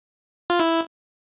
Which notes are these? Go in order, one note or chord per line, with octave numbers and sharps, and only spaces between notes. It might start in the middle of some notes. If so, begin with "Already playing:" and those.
F4
E4